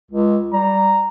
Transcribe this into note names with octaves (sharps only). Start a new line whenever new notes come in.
C#2
G3 A#5